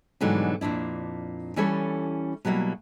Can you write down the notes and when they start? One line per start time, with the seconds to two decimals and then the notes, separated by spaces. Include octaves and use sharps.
0.21 G#2 B2 D3 E3 F#3 G3
0.61 F2 A#2 D4 E4
1.56 E3 G3 C#4 E4 A4 C#5
2.45 B2 F#3 G3 A#3 E4